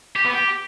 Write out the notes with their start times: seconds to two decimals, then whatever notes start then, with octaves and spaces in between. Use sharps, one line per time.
0.16 G4
0.25 B3
0.34 G4